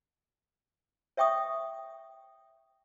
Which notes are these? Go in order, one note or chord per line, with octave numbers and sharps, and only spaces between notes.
C#5 E5 G5 C#6 D#6